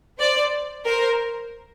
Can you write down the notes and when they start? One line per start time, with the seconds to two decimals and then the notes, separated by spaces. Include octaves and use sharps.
0.19 C5 D5
0.85 A#4 C5